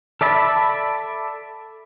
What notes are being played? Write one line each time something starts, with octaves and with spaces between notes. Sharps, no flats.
A4 D5 E5 A5 B5